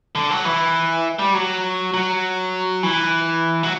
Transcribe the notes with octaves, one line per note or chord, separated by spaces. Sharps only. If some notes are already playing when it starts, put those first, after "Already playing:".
D3
F#3
E3
G3
F#3
F#3
E3
F#3